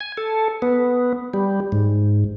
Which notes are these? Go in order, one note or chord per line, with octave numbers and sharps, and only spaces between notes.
G#5
A4
B3
G3
G#2